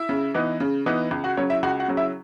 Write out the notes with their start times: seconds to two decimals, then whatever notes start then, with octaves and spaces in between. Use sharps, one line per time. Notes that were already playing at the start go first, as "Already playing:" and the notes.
Already playing: E4 E5
0.09 C#3
0.34 E3 B3 D#4
0.60 C#3
0.86 E3 B3 D#4
1.11 C#2
1.24 F#4 F#5
1.37 C#3 F#3 C#4 C#5
1.50 E4 E5
1.63 C#2 F#4 F#5
1.80 F#4 F#5
1.88 C#3 F#3
1.97 E4 E5